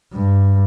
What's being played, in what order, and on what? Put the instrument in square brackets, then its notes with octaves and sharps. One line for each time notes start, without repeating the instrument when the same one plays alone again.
[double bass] G2